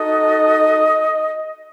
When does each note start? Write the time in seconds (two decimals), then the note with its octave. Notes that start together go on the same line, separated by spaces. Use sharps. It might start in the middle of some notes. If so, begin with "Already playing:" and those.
Already playing: D#4 F#4 A4 D#5